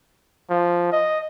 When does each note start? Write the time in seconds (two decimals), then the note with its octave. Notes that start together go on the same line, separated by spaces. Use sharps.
0.50 F3
0.92 D#5